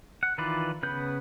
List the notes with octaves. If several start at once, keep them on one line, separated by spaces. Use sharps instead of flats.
F#5
D#3 E3 F4 B4 D5
C#3 B3 B4 G6